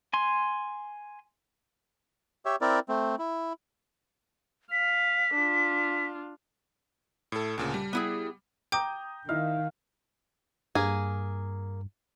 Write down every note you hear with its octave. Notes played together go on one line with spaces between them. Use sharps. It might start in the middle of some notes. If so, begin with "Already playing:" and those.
G#5 C6
G4 C#5 E5
C4 E4 A#4 D5
A3 C4
E4
F5 B6
D4 F4
A2 A4
D2 A#2 C#3 A5
G3
B3 E4 G#4
G5 A#5 D6 D#6 G6
D#3 D#4 E4 F5
G2 A#3 G#4